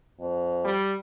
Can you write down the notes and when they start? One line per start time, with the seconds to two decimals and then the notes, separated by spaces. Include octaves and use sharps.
0.19 F2
0.65 G3